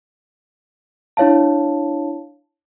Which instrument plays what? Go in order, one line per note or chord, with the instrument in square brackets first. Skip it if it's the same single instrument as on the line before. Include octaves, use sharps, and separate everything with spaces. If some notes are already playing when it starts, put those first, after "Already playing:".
[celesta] D4 E4 C#5 F5 A5